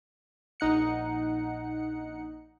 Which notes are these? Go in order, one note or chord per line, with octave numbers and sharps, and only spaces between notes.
A#1 D#4 F#5 C#7